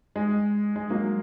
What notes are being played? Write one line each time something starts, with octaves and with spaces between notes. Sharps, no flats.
G#3
G#3
F#3 A#3